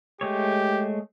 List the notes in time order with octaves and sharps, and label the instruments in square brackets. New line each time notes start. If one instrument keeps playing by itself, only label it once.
[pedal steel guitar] G#3 A3 C#5 [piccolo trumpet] G4